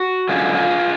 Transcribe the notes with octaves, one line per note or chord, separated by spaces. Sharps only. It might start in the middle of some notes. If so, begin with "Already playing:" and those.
Already playing: F#4
F#2 D3 G#3 F4 G#4
F4 G#4